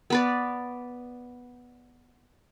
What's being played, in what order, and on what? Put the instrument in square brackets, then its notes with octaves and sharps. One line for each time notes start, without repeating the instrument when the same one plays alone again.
[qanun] B3 B4 D5